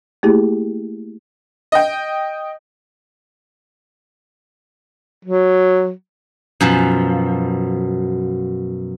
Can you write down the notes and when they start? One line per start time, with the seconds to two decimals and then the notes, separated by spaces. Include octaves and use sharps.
0.23 A3 A#3 E4 G4 G#4
1.72 D#5 G5
5.25 F#3
6.60 F#2 B2 F3